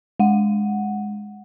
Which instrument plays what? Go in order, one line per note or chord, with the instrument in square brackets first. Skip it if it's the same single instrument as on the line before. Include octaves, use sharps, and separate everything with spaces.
[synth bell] G#3 F#5